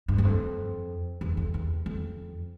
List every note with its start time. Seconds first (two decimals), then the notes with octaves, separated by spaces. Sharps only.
0.08 G2
0.18 E2
0.25 F2
1.21 E2
1.37 F2
1.54 E2
1.86 F2